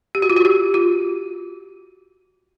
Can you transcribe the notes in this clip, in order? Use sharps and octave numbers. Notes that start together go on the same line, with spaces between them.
G4
F#4
F4
F#4
G4
F4